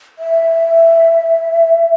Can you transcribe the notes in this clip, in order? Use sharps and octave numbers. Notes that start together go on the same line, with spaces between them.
E5